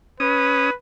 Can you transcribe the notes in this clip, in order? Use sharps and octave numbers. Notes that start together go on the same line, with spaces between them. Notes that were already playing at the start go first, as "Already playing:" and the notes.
C#4 B4 D#6